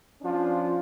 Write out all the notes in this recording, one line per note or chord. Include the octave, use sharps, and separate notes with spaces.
F3 C#4 D4 F4